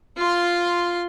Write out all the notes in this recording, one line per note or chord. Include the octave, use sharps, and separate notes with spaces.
F4 C6